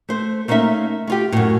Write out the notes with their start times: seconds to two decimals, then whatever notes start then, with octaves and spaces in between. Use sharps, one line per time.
0.09 A3 C5
0.48 A3 A#3 C#4 D#4 E5
1.07 A3 F4 G4
1.32 F#2 A2